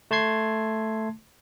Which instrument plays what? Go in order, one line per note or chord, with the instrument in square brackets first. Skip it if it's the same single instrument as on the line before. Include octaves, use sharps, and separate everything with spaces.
[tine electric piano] A3 A5 C6 G#6 C7